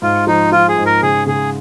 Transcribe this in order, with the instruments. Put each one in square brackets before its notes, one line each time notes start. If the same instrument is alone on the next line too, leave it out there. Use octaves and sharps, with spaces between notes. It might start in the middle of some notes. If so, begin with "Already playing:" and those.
[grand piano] G#2 [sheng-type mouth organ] F4
[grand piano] F3 [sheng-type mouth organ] D#4
[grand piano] F3 [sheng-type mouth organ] F4
[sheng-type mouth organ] G#4
[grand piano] G#2
[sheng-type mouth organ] A#4
[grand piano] C#3 [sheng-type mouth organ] G#4
[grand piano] C#3 [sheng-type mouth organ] G#4